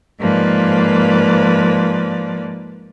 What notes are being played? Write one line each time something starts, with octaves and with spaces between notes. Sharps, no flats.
G#2 F3 A#3 B4 D5